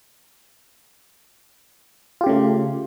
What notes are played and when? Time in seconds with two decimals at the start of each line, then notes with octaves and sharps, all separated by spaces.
2.21 F4
2.24 G4
2.26 C#3
2.29 A3